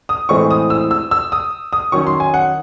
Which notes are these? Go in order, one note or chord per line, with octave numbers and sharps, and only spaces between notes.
D#6
A2 E3 G#3 C4 C#6
D#6
E6
E6
E6
D#6
D#6
D#3 F#3 C#4 C#6
C6
G#5
F#5